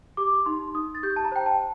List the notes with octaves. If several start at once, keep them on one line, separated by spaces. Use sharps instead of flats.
G4 D6
D#4 C6
D#4 D#6
A6
G4 G6
A5
A#5
C5 G5
A5